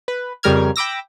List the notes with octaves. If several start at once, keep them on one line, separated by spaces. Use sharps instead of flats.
B4
F2 C#3 G3 A#4 F6 G#6
G5 B5 D6 E6 A#6